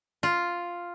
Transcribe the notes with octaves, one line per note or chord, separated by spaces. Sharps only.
F4